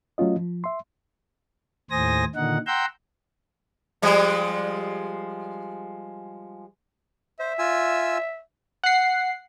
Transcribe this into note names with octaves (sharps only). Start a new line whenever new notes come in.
F#3 A3 C#4 F4 D#5
F3
E5 C6
D#2 A2 C5 G#5 D#6 A#6
A#2 D3 D#3 D#4 F#5
F#5 G5 A#5 C6 E6 G6
F3 G3 G#3
C5 E5
F4 G#5 E6
F#5 C7